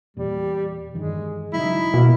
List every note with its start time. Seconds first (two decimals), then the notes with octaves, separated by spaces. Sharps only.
0.17 E2 A#2 G3
0.94 G2 D#3 E3 G#3
1.53 C#3 F#3 G#3 D#4 E4
1.94 B2 A#3